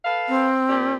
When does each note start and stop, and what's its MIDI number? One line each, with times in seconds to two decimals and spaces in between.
0.04 0.47 69
0.04 0.47 71
0.04 0.47 77
0.29 0.94 60
0.69 0.96 46
0.69 0.96 62
0.69 0.96 67